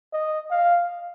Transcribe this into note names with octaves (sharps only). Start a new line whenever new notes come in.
D#5
F5